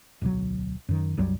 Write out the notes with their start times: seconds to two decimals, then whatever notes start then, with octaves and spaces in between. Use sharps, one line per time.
0.21 D1 B1 F#3
0.89 F#2 D#3
1.17 C2 F#2 F#3 G3